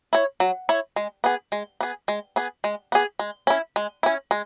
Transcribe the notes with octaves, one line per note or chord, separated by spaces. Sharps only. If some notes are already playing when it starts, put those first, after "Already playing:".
E4 C#5
F#3
E4 C#5
G#3
B3 G#4
G#3
B3 G#4
G#3
B3 G#4
G#3
B3 G#4
G#3
C#4 E4
G#3
C#4 E4
G#3